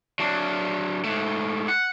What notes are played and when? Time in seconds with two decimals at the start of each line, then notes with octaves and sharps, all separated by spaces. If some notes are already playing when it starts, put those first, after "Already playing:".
0.19 F#3 D4
1.04 G#2 A3
1.68 F#5